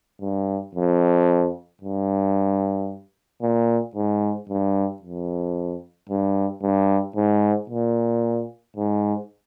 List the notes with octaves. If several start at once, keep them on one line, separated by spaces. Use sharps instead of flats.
G2
F2
G2
A#2
G#2
G2
F2
G2
G2
G#2
A#2
G#2